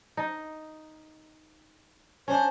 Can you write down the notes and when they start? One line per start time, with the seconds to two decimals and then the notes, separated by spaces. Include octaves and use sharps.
0.17 D#4
2.28 C#4 D4 C5